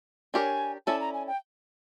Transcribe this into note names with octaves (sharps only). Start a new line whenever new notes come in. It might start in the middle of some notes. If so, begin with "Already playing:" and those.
D4 G4 A#4 C#5 G#5
C#4 E4 A4 D5 A5
A#5
G#5
G5